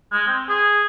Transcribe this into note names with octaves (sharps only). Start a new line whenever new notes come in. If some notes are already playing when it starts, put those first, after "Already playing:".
G#3
C4
G#4